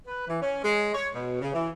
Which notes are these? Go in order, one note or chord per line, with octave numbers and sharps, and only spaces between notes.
B4
E3
C#4
G#3
C#5
B2
C#3
E3